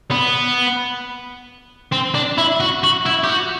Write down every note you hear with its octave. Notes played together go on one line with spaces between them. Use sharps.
B3
C4
D4
E4
F#4
F#4
E4
G4
F#4